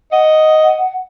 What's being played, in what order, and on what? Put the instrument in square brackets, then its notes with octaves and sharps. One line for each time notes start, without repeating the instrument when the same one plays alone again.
[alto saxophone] D#5 [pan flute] F#5